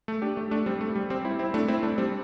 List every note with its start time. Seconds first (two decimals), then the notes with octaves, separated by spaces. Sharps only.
0.08 A3
0.22 D4 G4
0.37 A3
0.51 A3 D4
0.66 G3 C4
0.81 A3
0.96 G3
1.10 G3 C4
1.25 C4 E4
1.39 C4 E4
1.54 A3 D4
1.68 C4 E4
1.83 A3 D4
1.98 G3 C4